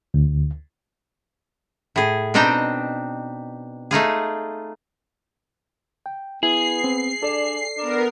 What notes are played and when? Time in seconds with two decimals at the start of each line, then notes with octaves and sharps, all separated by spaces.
0.14 D2
1.96 A2 G#4
2.34 B2 C4 D4 D#4 G5 A#5
3.91 A3 D#4 F4 G#4
6.06 G5
6.43 B3 E4 G#4 C7
6.84 C4
7.23 D4 A4 D5
7.78 B3 D4 A#4